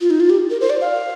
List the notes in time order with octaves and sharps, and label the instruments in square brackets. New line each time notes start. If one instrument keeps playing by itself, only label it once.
[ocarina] F4
D#4
F4
G4
A#4
C5
D5
F5